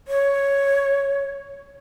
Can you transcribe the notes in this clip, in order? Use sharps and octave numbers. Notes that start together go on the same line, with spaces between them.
C#5